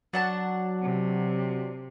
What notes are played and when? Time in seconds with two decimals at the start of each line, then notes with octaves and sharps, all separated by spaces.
0.13 F#3 D4 F#5 A5
0.83 C3